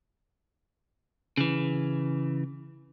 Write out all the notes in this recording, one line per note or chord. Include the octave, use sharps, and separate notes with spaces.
C#3 E3